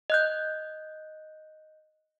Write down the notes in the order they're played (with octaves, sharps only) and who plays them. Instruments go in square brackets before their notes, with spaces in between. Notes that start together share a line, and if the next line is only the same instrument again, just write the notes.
[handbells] D#5 F#6 G6